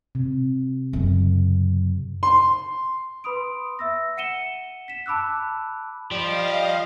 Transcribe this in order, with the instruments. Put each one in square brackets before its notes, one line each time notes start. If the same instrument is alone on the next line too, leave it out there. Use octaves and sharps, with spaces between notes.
[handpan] C3
[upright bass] F#2 C#3
[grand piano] C6
[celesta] B4 B5 C6 D#6 D7
E5 E6 A#6
F#5 C#7 D#7 E7 G7
B6 E7
A5 B5 D6 E6 F#6
[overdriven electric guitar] F3 [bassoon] G3 [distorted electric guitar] G4 [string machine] D#5 F5